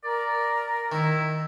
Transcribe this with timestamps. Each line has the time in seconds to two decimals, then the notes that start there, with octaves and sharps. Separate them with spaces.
0.04 A#4 D5
0.92 D#3 E4